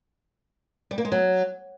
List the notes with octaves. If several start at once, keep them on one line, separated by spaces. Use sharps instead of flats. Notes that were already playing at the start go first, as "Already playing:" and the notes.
G3
A#3
G#3
F#3